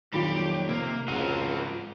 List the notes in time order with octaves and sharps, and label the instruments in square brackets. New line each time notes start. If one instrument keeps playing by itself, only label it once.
[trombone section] F2 A#2 [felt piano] D#3 F4 [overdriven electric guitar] F#3 B5 [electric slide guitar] G4
[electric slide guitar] C3 [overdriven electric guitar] A#3
[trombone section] C#2 [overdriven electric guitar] G#2 F#4 [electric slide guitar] C4 F4 F5 [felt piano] D#7